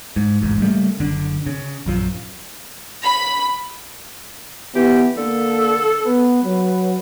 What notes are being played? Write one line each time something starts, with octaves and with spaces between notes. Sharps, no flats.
G#2
E1 A1 G#2
C#3 G3 A3 A#3
F#1 D3 D4
C#3
A#1 F#2 F3
B5
E3 B3 G4
D3 A#3 A4
B3 B4
F#3